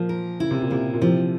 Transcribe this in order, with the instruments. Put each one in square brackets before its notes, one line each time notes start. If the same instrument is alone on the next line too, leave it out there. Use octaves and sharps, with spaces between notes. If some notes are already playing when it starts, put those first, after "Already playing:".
Already playing: [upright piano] A#2 [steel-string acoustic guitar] F3
[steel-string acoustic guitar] A#4
[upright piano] C#3 [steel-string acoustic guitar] E4
[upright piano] C3
A#2
[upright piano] C3 [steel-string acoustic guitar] A#3
[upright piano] A#2
[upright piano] C3 [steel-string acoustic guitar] F3